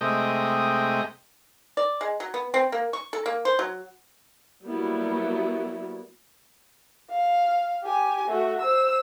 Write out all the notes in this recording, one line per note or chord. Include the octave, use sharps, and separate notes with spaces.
C3 G#3 A3 D#5 G5
D5
G#3
F#3
B3
C4
A#3
C#6
A4
A#3
C5
F#3
F#3 G3 A#3 B3 E4 F#4
F5
G4 G#5
A3 F#4
C5 E6